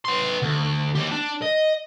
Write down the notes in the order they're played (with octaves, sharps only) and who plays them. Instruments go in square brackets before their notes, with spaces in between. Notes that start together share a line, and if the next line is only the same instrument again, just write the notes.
[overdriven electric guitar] B3 C6
D2
A#3 G4
D4
D#5